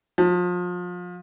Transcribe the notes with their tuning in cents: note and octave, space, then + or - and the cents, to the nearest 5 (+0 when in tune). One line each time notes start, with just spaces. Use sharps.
F3 +35